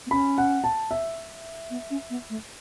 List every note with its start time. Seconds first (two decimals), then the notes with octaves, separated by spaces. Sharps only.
0.06 B3
0.11 C#4 B5
0.38 F#5
0.64 A5
0.91 E5
1.70 B3
1.90 C#4
2.10 B3
2.30 A3